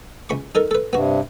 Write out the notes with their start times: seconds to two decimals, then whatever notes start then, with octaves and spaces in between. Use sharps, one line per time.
0.29 C#2 B5 C#6
0.55 D#4 A4 A#4
0.71 A4 B4
0.93 G2 C3 B3 F#4